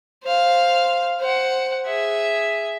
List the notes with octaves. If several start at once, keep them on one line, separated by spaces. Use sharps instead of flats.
C5 F5
C5 F#5
G#4 E5